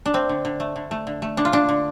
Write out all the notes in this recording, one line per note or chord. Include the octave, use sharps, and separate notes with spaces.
D4
A3 C4
D3
D3
A3
D3
A3
D3
A3
D3 D4
F4
D3 D4
D3